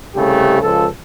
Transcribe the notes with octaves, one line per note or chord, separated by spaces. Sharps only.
C2 C#3 A3 G4
C#2 F3 A4